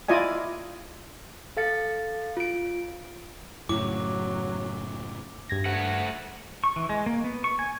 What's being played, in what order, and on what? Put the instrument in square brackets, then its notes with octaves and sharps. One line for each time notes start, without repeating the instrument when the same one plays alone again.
[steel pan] E4 F4 D5 D#5 G#5
[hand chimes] A4 F5 A6 C#7
F4 D7
[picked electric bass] F#2 A2 C#3 [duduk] F#3 [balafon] E4 [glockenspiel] D6
[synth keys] G2 G#6 A#6
[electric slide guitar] A3 F#5
[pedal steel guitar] C#6
E3
G#3
A#3
B3
C#6
G#5